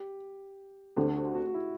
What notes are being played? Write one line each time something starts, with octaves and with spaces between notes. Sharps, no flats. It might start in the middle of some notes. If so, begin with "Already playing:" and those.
Already playing: G4
D2 D3 A3 C4 G4
F#4
F#4
F#4
E4